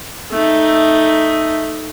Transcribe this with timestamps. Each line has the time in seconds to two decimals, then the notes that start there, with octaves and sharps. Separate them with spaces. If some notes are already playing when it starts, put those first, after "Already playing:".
0.31 A3 D#4